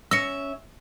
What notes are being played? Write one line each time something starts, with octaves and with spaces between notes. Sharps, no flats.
C#4 E5 E6 A#6 C#7